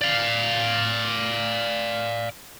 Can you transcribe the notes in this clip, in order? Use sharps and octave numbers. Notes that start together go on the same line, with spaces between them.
D5 F5